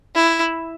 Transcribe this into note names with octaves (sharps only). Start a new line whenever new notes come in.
E4